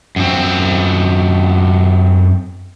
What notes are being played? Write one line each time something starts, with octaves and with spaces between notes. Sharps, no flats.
F#2 C4